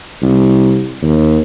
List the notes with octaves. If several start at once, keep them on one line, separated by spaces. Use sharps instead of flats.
C2
D#2